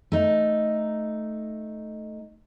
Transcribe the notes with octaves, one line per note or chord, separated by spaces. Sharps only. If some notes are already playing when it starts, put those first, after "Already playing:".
A3 D#4